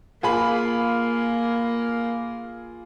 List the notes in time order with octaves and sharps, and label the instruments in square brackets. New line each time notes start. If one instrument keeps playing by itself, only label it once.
[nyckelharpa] A#3 [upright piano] F4 G#4 B5